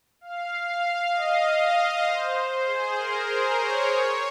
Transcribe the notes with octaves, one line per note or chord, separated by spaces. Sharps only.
F5
F5
D#5
C5
G#4
A#4
C5
C#5
C#5